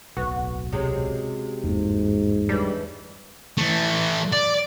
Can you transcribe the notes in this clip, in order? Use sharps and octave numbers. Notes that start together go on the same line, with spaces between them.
D1 B1 B3 F#4
C3 G#3 C#4
G1 E2 G#2 A#3
E3 G3 G#3 D4
E3 A3
D5